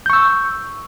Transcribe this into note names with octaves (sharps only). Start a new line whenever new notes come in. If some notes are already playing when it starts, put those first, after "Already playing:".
C#6 E6 G6